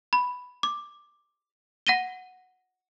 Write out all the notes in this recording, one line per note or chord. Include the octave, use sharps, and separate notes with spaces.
B5
D6
F#5 A#6 D#7 G7